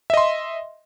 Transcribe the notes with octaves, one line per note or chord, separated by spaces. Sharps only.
D#5 E5 C6